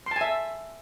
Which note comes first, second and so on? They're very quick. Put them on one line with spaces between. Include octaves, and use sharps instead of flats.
C6 A5 G#5 E5